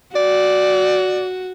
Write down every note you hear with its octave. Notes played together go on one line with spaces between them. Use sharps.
F#4 D5